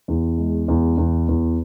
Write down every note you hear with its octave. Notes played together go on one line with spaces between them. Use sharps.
E2
G#3
E2
E2
E2